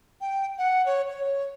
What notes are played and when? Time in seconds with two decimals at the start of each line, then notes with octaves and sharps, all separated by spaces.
0.21 G5
0.58 F#5
0.86 C#5
1.09 C#5